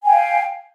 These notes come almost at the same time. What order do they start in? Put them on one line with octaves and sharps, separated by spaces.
G#5 G5 F5